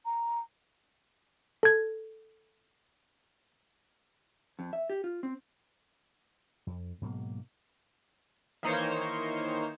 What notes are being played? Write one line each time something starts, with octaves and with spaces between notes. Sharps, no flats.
A#5
A4 G#6
F2
E5
G4
F4
C4
F2
G#2 B2 F#3 A#3
D#3 E3 A#3 D#4 C5 C#5